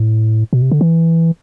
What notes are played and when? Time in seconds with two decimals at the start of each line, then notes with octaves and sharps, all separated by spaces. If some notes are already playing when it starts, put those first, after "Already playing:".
Already playing: A2
0.53 B2
0.62 C3
0.72 D3
0.81 E3